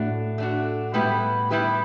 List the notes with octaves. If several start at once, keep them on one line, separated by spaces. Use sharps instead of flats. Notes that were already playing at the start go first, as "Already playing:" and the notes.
Already playing: A2 A3 D4 F#4
A3 D4 F#4
A2 G3 B3 E4 G4 B4
G3 B3 E4 G4 B4